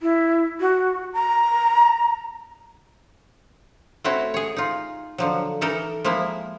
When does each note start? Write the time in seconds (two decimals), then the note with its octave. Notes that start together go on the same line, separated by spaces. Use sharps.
0.01 E4
0.61 F#4
1.13 A#5
4.04 A3 C4 E4 F#4 C#5
4.34 G#4 C#5
4.56 D#4 F4
5.18 D3 F3 F#3
5.61 E3 D#4 A4 A#4
6.04 F3 G#3 A#3 E4